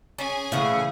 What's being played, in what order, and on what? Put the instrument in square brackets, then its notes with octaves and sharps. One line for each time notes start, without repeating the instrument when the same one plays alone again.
[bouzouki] C#4 [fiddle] G#4 G#5
[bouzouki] A2 F#5 [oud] C#3 E3 [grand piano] E4 F5